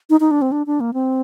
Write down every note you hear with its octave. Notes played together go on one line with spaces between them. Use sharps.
D#4
D#4
D4
C4
D4
D4
A#3
C4